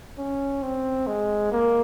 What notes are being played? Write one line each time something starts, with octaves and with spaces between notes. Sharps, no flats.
C#4
C4
G#3
A#3